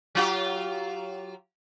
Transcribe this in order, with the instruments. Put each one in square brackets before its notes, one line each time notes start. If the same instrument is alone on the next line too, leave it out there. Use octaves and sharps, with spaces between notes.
[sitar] F#3 F4 G4